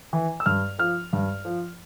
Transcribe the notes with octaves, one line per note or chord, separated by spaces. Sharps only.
E3
E6
G2 F6
F3 F6
G2
F3